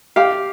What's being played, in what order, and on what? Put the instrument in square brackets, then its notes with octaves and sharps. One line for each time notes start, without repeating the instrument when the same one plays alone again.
[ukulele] G4 [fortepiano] F5